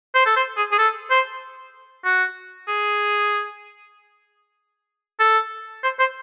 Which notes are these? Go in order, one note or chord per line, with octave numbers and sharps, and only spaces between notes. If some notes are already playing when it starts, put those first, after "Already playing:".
C5
A4
C5
G#4
G#4
A4
C5
F#4
G#4
A4
C5
C5